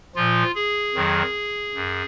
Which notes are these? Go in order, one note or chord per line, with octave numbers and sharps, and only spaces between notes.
A#2 F3 F4
G#4
F2 D#3 F#3
F#2